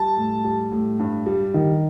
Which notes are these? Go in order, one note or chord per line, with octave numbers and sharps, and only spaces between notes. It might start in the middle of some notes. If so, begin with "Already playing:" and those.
Already playing: G3 A5
A2
G3
A2
G2
G3
D#3